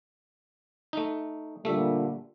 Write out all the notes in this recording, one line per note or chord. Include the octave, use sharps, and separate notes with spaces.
A3 D#4
A#2 D3 G3 A3 E5